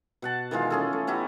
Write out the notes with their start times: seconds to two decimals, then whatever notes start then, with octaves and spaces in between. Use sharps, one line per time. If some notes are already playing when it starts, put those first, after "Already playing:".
0.22 B2 F#5 A5
0.51 D#3 E3 G#3 F4
0.70 C#4 G#4 A4
0.93 A3
1.07 B3 D#4 E4 G4